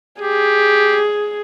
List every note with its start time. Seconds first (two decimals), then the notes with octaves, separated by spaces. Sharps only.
0.22 G4 G#4